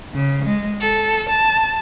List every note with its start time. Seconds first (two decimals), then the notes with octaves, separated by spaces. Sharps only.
0.14 C#3
0.45 G#3
0.80 A4
1.29 A5